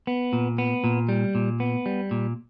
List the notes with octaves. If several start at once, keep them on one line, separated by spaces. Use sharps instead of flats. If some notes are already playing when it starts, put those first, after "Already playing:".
B3
A#2
B3
A#2
G3
A#2
B3
G3
A#2